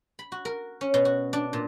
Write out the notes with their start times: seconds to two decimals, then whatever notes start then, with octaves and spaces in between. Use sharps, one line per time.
0.19 B5
0.32 F#4
0.45 A#4
0.81 C#4
0.94 B2
1.05 F#4
1.33 D4
1.53 A#2